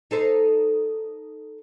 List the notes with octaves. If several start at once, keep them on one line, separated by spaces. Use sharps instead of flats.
D#4 A4 C5